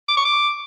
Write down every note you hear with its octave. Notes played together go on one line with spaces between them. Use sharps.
D6
C#6
D6